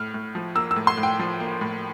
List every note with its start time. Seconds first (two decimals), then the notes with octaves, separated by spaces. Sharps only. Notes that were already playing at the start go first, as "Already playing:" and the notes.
Already playing: A2 F6
0.14 A2
0.35 F3
0.55 A#3 E6
0.71 E6
0.76 A2
0.87 C6
0.97 A2
1.03 G5
1.19 F3
1.40 A#3
1.61 A2